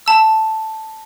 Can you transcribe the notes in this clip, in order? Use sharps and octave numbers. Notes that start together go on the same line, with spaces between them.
A5 E6